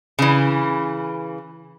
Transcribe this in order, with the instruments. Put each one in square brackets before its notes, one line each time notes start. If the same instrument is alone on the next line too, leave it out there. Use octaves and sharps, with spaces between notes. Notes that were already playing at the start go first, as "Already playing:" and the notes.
[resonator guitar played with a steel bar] C#3 E3